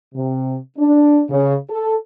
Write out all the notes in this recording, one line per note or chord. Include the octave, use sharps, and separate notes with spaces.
C3
D4
C#3
A4